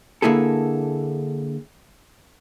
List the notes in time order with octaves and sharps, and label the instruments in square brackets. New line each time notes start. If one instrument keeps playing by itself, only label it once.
[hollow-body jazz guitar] D3 A#3 E4 G#4 A4